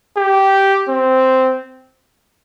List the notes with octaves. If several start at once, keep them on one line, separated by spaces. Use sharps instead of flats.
G4
C4